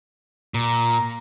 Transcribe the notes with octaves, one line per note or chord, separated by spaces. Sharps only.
A#2 A#5